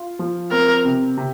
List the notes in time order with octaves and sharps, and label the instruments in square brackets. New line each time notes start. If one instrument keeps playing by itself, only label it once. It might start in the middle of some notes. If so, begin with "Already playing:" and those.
Already playing: [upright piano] F4
F3
[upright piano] C4 [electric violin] A#4
[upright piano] C3
C3